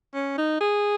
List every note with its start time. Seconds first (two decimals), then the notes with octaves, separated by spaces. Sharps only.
0.15 C#4
0.38 D#4
0.60 G#4